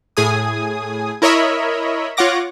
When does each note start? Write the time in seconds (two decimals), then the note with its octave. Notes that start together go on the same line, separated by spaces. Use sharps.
0.17 A2 G#4 G#5 D#6
1.22 E4 A#4 C#5 D#5 E5 B5
2.17 F4 C#5 F#5 D6 A#6